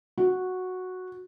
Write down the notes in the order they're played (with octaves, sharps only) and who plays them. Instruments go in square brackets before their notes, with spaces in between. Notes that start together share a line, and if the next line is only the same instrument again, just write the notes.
[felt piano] F#4